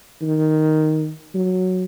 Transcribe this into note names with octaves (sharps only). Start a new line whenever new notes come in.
D#3
F#3